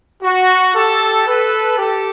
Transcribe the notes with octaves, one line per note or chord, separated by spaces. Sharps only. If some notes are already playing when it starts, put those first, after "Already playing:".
F#4
G4 A4
A4 B4
G4 A4